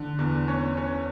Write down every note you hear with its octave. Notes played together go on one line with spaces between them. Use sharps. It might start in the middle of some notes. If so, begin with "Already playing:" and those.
Already playing: D3
E2
C#4
C#4